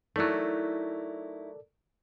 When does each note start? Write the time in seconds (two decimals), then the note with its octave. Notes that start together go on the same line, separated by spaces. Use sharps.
0.16 F#3 A3 D#4 E4 A4 A#4 D5